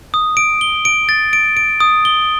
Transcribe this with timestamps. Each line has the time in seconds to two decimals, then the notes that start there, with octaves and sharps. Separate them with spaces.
0.14 D#6
0.37 D7
0.61 G7
0.85 D7
1.09 A6
1.33 D7
1.57 D7
1.80 D#6
2.05 G7